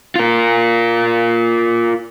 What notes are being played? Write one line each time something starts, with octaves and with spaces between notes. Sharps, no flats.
F4 A#4